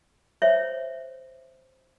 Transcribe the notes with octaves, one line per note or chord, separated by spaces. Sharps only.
C5 C#5 E5